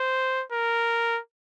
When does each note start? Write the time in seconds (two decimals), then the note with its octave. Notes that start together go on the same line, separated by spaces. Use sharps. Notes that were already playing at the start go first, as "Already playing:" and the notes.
Already playing: C5
0.52 A#4